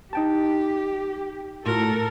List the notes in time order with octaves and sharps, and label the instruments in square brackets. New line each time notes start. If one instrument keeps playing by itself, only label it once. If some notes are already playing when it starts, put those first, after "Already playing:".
[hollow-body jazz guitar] D#4 G5 A5 [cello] G4
[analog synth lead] A2 [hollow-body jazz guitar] F4 F#4 [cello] A4 [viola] A#4